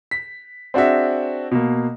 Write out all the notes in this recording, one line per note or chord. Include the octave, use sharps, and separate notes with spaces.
B6
C4 D4 F#4 G#4 E5
B2 A#3